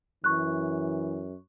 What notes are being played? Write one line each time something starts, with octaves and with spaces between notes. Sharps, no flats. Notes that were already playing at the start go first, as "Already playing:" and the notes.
F#2 E3 C#6 F#6